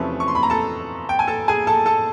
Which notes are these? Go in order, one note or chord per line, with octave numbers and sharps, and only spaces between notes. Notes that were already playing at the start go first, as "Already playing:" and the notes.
Already playing: E2 C3 F3 A3 C#4 B4
C#6
C6
B5
A#5
A4 A5
G5
G#5
A4 A5
G#4 G#5
A4 A5
A4 A5